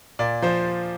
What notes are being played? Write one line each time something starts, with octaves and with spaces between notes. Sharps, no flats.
A#2 D5
F3 C5